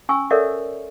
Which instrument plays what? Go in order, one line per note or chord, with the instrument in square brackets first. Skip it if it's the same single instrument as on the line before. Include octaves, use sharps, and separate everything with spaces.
[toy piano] C#4 G#5 C#6 E6
A4 A#4 C#5 D5 E5 F#5